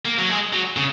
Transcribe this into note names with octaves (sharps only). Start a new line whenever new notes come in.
A#3
F#3
G#3
F#3
C#3